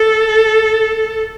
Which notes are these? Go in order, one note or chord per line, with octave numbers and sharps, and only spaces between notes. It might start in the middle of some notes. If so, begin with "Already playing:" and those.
Already playing: A4